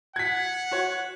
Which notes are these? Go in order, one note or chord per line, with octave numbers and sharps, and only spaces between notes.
F#5 G#6 B6
F#4 C#5